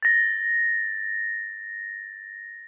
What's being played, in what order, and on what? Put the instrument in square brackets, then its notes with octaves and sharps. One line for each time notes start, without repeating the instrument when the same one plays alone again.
[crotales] A6 A#6